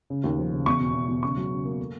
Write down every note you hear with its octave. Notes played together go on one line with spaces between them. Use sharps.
C#3
D#2
F3
C#3
E2 C#6
B2
B2
E2
C#3 C#6
F#3
C#3
A#3
A3